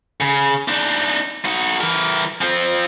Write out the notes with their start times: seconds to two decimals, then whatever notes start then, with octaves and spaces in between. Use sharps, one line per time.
0.21 C#3
0.68 D4 D#4
1.45 D#4 F#4
1.81 E3 A#4
2.41 F3 C4